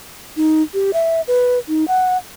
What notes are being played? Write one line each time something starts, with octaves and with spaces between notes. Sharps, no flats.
D#4
G4
E5
B4
D#4
F#5